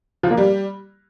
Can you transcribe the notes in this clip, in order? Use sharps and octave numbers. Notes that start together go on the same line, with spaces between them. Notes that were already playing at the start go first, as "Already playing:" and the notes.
F3
A#3
G3